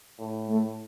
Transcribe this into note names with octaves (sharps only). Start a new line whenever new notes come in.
A2
A3